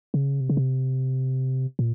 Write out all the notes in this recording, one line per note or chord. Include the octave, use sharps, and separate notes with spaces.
C#3
C3
C#3
C3
A#2